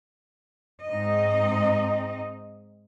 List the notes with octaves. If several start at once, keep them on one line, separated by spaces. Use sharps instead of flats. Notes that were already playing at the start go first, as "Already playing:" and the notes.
G#2 C4 D#4 D#5